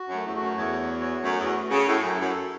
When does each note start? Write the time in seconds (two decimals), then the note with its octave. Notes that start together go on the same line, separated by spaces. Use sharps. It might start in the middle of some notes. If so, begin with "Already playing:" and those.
Already playing: F#4
0.09 F#2
0.14 A3
0.25 E2
0.36 F#4
0.41 F#2
0.57 E2 C#5
0.80 F#4
1.01 C#5
1.22 F#2 A3
1.39 E2
1.44 F#4
1.65 F#4
1.71 C#3
1.87 A2 E4
2.03 F#2
2.08 E4
2.20 F#2
2.31 A4